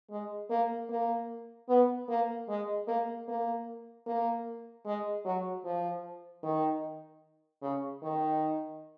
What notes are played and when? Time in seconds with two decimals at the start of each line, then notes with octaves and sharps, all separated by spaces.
0.11 G#3
0.50 A#3
0.90 A#3
1.69 B3
2.09 A#3
2.49 G#3
2.88 A#3
3.28 A#3
4.07 A#3
4.86 G#3
5.25 F#3
5.65 F3
6.43 D#3
7.62 C#3
8.03 D#3